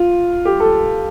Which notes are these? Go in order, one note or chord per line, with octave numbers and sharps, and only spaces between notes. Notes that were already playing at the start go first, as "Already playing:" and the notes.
Already playing: F4
G4
A4